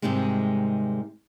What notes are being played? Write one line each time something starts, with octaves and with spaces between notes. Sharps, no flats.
G#2 C3 D#3 G3 G#3